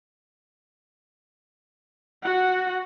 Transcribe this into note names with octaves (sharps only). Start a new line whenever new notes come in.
F#4 F#5